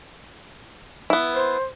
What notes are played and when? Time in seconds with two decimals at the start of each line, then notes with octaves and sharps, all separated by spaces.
1.10 B3 E4
1.34 C5